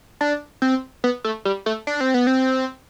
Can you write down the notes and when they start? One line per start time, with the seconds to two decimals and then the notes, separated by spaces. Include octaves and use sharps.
0.21 D4
0.62 C4
1.04 B3
1.25 A3
1.45 G3
1.66 A3
1.87 D4
2.01 C4
2.14 B3
2.27 C4